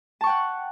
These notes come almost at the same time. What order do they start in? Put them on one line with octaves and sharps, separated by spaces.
A5 C#6 G5 F#5